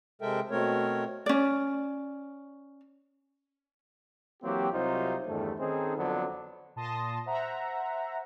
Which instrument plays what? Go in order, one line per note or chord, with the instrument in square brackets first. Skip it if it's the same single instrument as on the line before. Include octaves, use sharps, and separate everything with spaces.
[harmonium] C3 G#3 A4 A#4 E5 G5
B2 A3 C4 A#4 C#5
[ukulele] C#4 D5
[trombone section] E3 F#3 A#3 C4 G4
C2 C3 F#3 D#4 F4 C5
E2 G2 D#3 G3 A3
D#3 C4 C#4 D#4 G#4 A4
F2 D3 F3 F#3 B3 D4
[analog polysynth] A#2 A5 C6 D#6 A#6
C5 E5 F#5 A#5